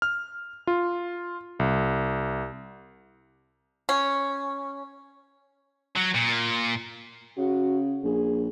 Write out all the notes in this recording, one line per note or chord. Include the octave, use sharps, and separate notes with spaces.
F6
F4
C2
C#4
F#3
A#2
C#3 F#4
A#1 G#4